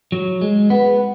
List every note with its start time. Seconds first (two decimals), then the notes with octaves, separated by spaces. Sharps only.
0.12 F#3
0.42 G#3
0.70 B3